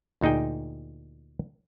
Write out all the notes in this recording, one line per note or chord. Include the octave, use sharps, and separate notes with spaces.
D2 A#2 D#4 G#4 G5